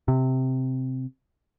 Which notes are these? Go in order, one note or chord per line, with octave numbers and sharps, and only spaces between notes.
C3